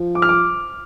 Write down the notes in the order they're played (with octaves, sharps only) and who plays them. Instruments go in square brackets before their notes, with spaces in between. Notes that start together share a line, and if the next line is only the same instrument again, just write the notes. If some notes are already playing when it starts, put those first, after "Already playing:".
Already playing: [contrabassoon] F3
[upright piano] D6
F6
D6